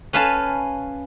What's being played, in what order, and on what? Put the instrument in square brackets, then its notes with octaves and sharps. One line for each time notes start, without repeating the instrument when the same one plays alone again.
[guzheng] C#4 B4 F5 G#5 A5